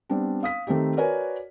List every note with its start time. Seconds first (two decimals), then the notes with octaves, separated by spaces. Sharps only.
0.09 G3 B3 C4 D4
0.43 F5 D#6 B6
0.67 D#3 A3 C4 D#4 G4
0.97 F#4 A#4 B4 C#5 D5 G#5